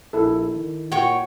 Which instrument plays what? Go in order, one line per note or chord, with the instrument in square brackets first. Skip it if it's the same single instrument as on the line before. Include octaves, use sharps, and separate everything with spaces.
[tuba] A#1 [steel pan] E4 A4
[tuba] D#3
[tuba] A#2 [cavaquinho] F#4 C#5 C#6 [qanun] G5